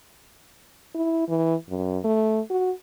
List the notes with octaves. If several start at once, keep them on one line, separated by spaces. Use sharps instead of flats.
E4
E3
F#2
A3
F#4